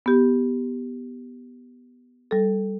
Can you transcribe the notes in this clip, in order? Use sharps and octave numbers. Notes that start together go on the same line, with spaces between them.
B3 G4
G3 A4